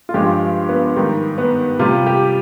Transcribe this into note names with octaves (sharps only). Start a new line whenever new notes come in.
F4
G2 F3 G#3 G4
B3
G#2 D#3 G3
B3
C3 G3 F4
G4